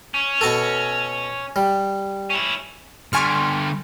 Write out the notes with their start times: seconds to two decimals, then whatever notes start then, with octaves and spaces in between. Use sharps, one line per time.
0.14 C#4
0.41 B2 F#4 A4
1.56 G3
2.30 C#4 E4
3.13 D3 G3 G#5 C6 C#6 F6